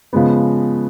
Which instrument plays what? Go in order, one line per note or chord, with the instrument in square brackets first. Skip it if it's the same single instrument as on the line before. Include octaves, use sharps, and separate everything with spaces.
[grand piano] C#3 F3 G#3 B3